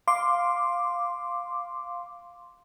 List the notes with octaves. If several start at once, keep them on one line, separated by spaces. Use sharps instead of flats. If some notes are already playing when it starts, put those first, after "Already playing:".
F5 C6 D6